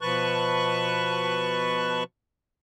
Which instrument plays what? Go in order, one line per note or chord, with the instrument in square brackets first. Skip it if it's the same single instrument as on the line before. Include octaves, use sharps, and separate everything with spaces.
[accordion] B2 F3 B4 A5 C#6 F#6